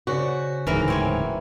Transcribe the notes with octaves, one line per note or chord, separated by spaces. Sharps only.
C#3 F#4 C5 D5
D1 G#2 E3 A#3 A#4
C4 C#5 G#5